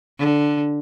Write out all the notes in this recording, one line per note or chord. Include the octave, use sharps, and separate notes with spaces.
D3